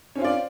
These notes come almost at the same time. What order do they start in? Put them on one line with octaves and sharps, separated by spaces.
C#4 C4 F4 D5